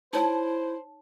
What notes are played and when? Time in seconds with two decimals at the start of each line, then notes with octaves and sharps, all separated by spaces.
0.13 D#4 E4 C5 C#5 A5